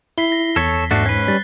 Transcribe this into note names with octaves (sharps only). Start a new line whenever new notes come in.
E4 B6 C7 G7
A#6
E2 A4 C#5 B6
G#2 A3 D4 F#4 F#6 C7
C#4 B4
G3 A6